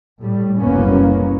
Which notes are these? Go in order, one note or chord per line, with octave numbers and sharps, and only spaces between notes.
A2 G3
F#1 C2 F#2 A#3 B3 C#4